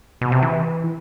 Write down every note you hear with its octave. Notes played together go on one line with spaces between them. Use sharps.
B2
C3
E3